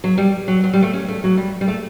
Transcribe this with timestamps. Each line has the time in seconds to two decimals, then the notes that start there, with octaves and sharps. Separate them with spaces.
0.04 F#3
0.18 G3
0.48 F#3
0.64 F#3
0.74 G3
0.82 A3
0.93 C#4
1.08 A3
1.24 F#3
1.37 G3
1.61 G3
1.68 A3